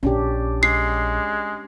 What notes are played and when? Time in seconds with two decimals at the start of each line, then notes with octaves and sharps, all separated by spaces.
0.03 A#1 C#4 D4 G4
0.63 G#3 C7